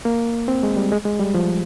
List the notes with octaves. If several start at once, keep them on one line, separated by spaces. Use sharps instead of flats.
A#3
C4
G#3
G3
G#3
G#3
G3
F3